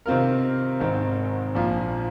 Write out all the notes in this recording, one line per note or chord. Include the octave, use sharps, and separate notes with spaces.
C3 D#3 C4 F4 A#4
G#1 G#2 D#3 C4
A#1 A#2 F3